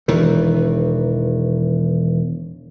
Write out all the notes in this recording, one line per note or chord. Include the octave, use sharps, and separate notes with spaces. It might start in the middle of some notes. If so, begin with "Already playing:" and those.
E1 D#3 E3